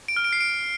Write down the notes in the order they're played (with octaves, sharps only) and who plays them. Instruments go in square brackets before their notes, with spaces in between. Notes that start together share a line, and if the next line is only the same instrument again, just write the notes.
[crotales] D7
F6
D7
C7
D7